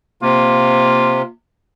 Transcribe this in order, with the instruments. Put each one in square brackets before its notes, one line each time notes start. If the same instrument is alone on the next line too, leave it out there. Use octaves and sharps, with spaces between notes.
[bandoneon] C3 [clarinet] A#3 [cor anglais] F4